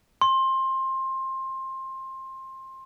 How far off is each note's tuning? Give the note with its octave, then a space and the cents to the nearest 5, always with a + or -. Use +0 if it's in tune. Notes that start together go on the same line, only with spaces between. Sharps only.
C6 +20